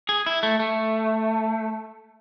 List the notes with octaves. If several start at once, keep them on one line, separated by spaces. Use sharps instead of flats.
G#4
E4
A3
A3